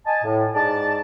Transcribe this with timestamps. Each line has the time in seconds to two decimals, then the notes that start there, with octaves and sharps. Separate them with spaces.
0.06 D#5 G#5 A5
0.24 A2
0.55 G#2 D5 A5